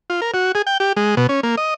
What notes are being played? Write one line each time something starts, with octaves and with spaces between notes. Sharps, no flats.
F4
A#4
F#4
G#4
G5
G4
G#3
B2
C#4
A#3
D#5